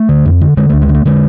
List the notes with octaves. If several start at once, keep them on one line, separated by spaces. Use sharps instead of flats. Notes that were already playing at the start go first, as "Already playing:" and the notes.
Already playing: A3
D3
F2
D3
D3 G#3
D2 A3
G#3
D3
A3
D3 G#3